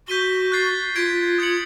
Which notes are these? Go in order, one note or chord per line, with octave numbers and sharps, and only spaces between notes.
F#4 G6 B6 D#7 G7
F#6 A6 C7
F4 G#6 B6 D7
D#6 G#6 C#7 F#7